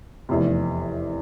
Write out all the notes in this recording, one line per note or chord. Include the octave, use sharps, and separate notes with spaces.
F1 E2 C3